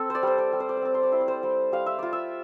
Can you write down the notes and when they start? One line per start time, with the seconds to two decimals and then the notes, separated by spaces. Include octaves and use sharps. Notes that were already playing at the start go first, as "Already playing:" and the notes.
Already playing: C4 A4
0.10 C5 D5
0.23 G3 C5
0.38 D5
0.53 G3
0.60 C5
0.69 D5
0.77 C5
0.82 C4 D5
0.94 C5
1.03 D5
1.12 E4 C5
1.21 D5
1.28 C5
1.43 G3
1.72 G3 F5
1.86 E5
1.99 F4 D5
2.13 E5